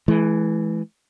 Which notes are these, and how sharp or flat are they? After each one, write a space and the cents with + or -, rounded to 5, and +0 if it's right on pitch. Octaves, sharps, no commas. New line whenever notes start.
E3 +0 G#3 +45